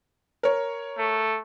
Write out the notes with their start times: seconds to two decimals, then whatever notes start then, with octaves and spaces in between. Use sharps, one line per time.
0.43 A#4 C#5
0.98 A3